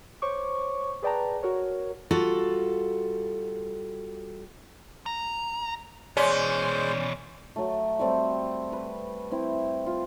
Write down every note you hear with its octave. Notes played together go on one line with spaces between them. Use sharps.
C5 C#5 C#6 D6
G#4 B4 D5 G5 A5 A#5
F#4 A#4 C#5
G3 F4 F#4 A4
A#5
B2 E3 G#3 C#4 C5 D5 C6
F#3 A3
G3 A3 C4
B4
C4 E4
F4